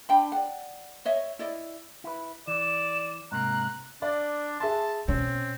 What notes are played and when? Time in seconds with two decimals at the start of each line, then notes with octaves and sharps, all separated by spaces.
0.09 D4 G5 B5
0.32 D5 F#5
1.05 C#5 D#5 E5
1.39 E4 D5 D#5
2.04 E4 B4
2.48 E3 D5 E7
3.32 G#2 C3 A#3 A#5 F#6
4.02 D4 D5
4.60 G#4 E5 A5 C6
5.08 B2 C4 C#4